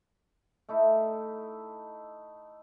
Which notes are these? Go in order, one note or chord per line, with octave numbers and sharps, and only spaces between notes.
A3 D#4 E4